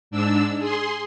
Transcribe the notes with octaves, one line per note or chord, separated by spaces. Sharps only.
G#2 D4 E6
G#4 C6